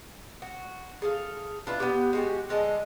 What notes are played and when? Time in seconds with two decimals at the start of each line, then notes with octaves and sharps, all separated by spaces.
0.42 F#4
1.02 G#4 A4 F5
1.67 D4 F4 B4 E5
1.80 B3 G4
2.13 G#3 F#4 G4
2.49 D3 G#3 D#5 A5